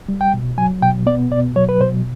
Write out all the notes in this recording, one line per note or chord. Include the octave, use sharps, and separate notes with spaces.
G3
G5
B2
F#3 G#5
B2 G5
B3 D5
B2 D5
F#3 C#5
B4
B2 C5